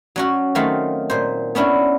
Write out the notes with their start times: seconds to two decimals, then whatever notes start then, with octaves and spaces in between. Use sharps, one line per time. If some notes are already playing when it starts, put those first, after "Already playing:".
0.16 F#3 C#4 F#4
0.55 D#3 F#3 A3 C4 F4
1.10 A#2 C5
1.55 B3 C#4 D4 E4